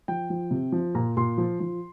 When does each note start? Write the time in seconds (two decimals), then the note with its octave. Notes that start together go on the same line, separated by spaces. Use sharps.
0.08 F3 G5
0.30 F3
0.51 C3
0.72 F3
0.95 A#2 A#5
1.17 A#2 C6
1.38 F3
1.60 F3